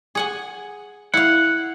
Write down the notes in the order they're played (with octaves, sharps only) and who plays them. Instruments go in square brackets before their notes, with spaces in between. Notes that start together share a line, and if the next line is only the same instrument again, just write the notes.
[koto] G#4 F#5 G#5
[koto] E4 F5 [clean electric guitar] F#5